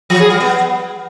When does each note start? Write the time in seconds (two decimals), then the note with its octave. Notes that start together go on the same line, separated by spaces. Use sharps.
0.10 F3
0.20 G#4
0.30 G3
0.40 B3